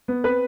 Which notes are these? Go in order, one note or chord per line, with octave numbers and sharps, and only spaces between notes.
B3
C4 B4